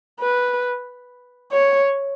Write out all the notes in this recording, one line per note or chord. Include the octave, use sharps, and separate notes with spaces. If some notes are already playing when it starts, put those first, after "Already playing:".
B4
C#5